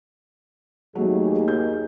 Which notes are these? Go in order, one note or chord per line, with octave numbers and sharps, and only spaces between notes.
D#2 F#3 A3 G#4
G6